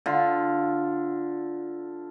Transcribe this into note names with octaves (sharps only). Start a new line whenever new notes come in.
D3 F4